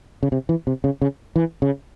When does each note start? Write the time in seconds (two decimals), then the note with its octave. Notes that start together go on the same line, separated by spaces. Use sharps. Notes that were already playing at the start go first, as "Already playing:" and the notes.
0.23 C#3
0.32 C3
0.49 E3
0.67 C3
0.84 C#3
1.02 C#3
1.36 E3
1.62 C#3